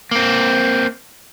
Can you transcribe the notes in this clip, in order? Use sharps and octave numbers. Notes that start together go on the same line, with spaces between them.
A#3 C4